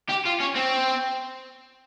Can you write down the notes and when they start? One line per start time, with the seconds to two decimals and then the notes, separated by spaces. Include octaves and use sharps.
0.09 G4
0.26 F4
0.40 C#4
0.56 C4